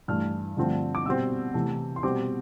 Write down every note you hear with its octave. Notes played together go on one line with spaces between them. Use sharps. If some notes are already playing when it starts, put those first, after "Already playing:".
G2 E3 A3 F6
G2 D3 F3 A3 C4
D6
B2 G3 C4 E6
C3 E3 A3
C6
B2 G3 C4 D6